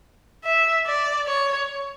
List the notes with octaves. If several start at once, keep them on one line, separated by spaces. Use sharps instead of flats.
E5
D5
C#5